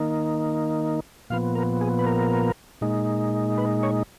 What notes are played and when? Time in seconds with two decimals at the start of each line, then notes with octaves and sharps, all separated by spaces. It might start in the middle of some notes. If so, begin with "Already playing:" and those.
Already playing: D#3 A#3 D#4
1.30 A#2 F3 B3 F5
1.55 A#4
1.81 G#4
1.99 B4
2.06 A#4
2.81 A#2 G#3 D#4
3.58 B4
3.83 C#5